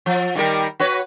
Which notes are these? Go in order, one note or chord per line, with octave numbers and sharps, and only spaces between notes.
F3
D#3 G3 A#4
F#4 B4 C#5